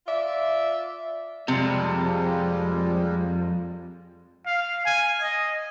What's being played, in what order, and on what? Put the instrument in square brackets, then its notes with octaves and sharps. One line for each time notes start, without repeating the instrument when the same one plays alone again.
[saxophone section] F4 D5 E5
[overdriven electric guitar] F2 [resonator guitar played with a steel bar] C3 [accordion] G3 G#3
[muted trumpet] F5
G#5
D#5